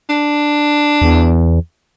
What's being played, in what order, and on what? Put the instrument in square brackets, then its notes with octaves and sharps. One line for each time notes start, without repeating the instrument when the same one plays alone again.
[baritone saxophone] D4
[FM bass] E2